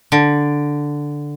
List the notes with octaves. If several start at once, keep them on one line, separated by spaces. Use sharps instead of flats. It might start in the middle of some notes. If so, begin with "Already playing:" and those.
D3